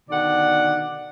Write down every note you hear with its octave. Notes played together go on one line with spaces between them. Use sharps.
B2 D3 D#3 D5 F#5